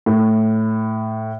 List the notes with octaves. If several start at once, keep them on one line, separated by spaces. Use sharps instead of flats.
A2